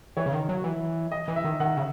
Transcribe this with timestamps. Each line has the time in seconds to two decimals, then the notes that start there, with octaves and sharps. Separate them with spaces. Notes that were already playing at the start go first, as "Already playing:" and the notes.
0.17 E3 C#5
0.26 C#3
0.33 D#3
0.49 F#3
0.64 E3
1.12 D#5
1.28 E3
1.36 E5
1.44 D#3
1.60 D#3 F#5
1.77 C#3